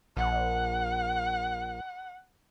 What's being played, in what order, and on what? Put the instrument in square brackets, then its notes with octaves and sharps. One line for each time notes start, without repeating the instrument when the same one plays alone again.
[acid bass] A#1 [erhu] F#5